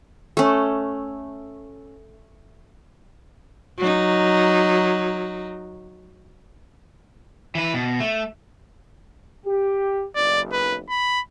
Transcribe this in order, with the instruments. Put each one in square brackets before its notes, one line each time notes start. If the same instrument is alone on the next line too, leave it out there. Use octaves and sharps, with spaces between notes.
[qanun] A3 C#4
[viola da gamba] F#3 D#4
[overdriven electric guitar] E3 B4
B2
A3
[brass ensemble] G4
[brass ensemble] F#1 B1 [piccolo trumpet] D5
[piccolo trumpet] B4
B5